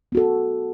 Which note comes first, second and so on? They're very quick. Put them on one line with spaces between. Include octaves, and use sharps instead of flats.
B3 F#4 A4